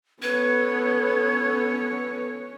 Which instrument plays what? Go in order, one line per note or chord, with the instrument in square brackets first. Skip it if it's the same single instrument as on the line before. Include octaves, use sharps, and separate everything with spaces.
[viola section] B3 A4 [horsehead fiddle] C#4 C#5 [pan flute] B4 [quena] G#6